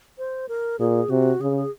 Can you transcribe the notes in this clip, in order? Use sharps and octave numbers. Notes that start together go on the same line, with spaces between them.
C5
A#4
A#2 G#4
C3 F#4
C#3 G#4
G#4